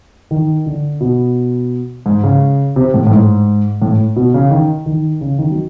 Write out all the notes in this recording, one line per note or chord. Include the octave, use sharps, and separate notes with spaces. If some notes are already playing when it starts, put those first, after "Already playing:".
D#3
D3
B2
G#2
C#3
C3
A2
A2
G#2
A2
B2
C#3
D#3
D#3
C#3
D#3
F#3